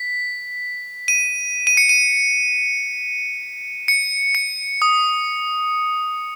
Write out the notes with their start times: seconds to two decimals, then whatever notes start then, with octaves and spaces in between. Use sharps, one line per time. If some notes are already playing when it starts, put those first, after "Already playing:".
Already playing: B6
1.08 D#7
1.67 D#7
1.77 C#7
1.89 D#7
3.88 C#7
4.35 C#7
4.82 D#6